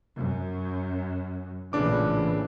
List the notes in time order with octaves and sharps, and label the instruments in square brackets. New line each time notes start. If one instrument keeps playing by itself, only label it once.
[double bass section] F#2
[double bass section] A#1 A2 E3 [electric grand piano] C#3 D4 D6